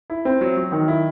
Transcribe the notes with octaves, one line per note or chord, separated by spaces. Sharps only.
E4
C4
F#3
F#3
D#3
E4